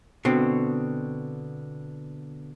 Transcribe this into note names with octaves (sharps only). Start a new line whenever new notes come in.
B2 D3 C4